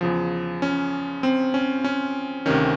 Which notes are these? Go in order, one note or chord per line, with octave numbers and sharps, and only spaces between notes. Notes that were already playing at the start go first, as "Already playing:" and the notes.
E2 C#3 F3
C#4
C4
C#4
C#4
D2 C3 D#3 C#4